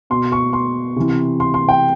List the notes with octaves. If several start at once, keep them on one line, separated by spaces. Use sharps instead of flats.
B2 C6
C#6
C6
C3 E3
C6
C6
G5